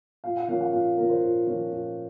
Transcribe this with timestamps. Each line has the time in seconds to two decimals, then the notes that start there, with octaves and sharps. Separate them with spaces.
0.24 A#2 F5
0.37 F#5
0.48 F3 A#3 C#4 F5
0.61 F#5
0.73 A#2 F5
0.98 F3 A#3 C#4 A#4
1.10 C5
1.23 A#2
1.47 F3 A#3 C#4
1.71 A#2